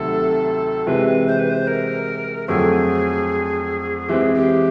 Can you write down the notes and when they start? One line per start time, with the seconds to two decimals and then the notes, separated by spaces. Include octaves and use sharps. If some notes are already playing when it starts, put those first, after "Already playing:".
Already playing: D2 C3 D#3 F#3 A3 A4
0.87 C3 E3 G#3 B4
1.28 C5
1.39 B4
1.50 C5
1.67 A#4
2.48 F2 D3 F#3 A3 C4 G#4
4.09 E3 G#3 C4 G4
4.21 G#4
4.34 G4